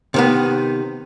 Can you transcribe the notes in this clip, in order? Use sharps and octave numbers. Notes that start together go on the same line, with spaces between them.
C3 D#3 B3